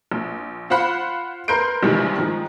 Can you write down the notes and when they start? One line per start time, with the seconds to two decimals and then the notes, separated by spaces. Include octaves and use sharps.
0.12 A#1
0.70 F4 C5 F5 F#5 B5
1.48 A#4 B4 C6 G6 C7 D7
1.83 A#1 G2 C3 D#3 E3 G#3
2.18 D#3 F3 G#3